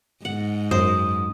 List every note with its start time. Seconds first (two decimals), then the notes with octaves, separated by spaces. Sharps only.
0.25 G#2 F#5
0.71 F#2 C5 D#6